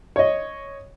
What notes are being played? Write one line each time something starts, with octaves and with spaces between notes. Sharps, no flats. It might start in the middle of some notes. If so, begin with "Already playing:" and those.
C#5 D#5